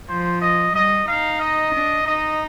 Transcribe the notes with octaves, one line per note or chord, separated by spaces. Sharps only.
F3 C5
D#5
G3 D#5
D#4 F5
D#5
D4
D#4 D#5